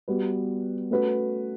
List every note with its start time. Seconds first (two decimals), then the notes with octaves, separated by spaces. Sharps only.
0.08 G3 B3 F#4 B4
0.91 A3 C#4 F#4 B4